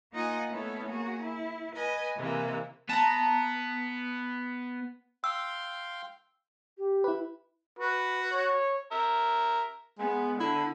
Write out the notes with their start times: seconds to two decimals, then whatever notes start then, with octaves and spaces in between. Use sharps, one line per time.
0.12 A#3 D#4 F4 D#5 F#5 G#5
0.50 A3 B3 C#4 E4 A4
0.88 A#3 F#4 G#4
1.22 E4
1.75 B4 D#5 G#5
2.18 C3 E3 G#3 A#3
2.89 B3 A5 A#5
5.24 F5 G5 C6 E6
6.78 G4
7.04 E4 B4
7.79 F#4 B4
8.32 C#5
8.92 A#4 E5
9.99 G#3 B3
10.40 D3 E4